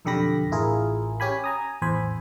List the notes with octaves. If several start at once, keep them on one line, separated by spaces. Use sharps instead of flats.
B1 F2 D3 G4 B5 A#6
A1 E4 F4 G#4 A#4
C#4 G4 G#5 B5
G#5 A#5 D#6
A1 E2 C5 G#5 B5